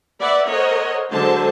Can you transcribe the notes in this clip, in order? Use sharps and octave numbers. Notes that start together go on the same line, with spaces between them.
B4 D5 E5 F#5
A4 A#4 C5 C#5 D#5 F#5
D3 F#3 G#3 A4 C5 A5